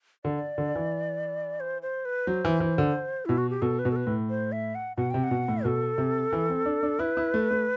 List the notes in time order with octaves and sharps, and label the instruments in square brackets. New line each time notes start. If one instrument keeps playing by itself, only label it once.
[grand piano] D3 [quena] D5
[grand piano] D3
E3
[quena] C5
C5
B4
[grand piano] F#3 [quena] C5
[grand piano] E3
E3
D3
[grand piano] B2 [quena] E4
[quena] F#4
G4
[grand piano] B2 [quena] A4
[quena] B4
[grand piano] B2
[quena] A4
B4
[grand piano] A2
[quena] C5
E5
F#5
[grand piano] B2 [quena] F#5
[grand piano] C3 [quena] G5
[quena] F#5
[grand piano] B2
A2
[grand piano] B2 [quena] A4
[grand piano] C3
E3
C4
D4
D4
[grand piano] E4 [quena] B4
[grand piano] E4
A3
A3